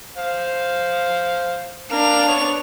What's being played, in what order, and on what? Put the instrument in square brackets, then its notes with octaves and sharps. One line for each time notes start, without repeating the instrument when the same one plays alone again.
[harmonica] C5 F5
[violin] D4 F7 [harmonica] A#4 F5 F6
[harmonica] B3 C#5